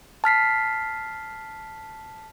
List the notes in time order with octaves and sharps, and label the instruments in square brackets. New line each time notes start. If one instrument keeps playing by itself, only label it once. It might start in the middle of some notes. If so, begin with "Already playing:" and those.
[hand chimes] A5 F6 B6 C7